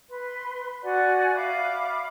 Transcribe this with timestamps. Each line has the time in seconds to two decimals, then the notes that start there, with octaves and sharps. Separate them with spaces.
0.09 B4 C6
0.82 F#4 D5 F#5 G#5
1.35 E5 F5 B5 D6